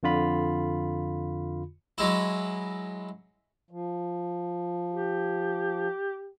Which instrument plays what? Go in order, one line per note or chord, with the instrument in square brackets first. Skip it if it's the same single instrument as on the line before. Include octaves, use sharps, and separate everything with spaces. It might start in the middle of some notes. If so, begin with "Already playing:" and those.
[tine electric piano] F2 D3 F4 B5
[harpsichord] F#3 G#3 E4
[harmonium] F3
[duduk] G4